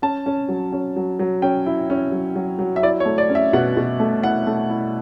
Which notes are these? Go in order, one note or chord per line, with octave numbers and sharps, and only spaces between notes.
C#4 A5
C#4
F#3
C#4
F#3
F#3
C#4 G5
E4
C#4
F#3
F#3
F#3
E5
E4 D5
C#5
A3
D5
C#4
E5
B2 F#5
B2
A3
E4 F#5
A3
E4